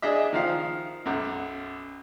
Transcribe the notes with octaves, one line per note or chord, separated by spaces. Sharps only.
D4 G#4 D#5 E5
D#3 F3 F5
B1 F#2